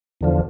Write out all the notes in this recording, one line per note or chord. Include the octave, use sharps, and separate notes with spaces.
E2 D3 F3